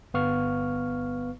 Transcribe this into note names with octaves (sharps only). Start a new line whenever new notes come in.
G1 B3 B4 F5 C#6 F6